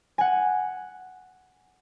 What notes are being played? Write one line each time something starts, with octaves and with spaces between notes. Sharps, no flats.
F#5 G#5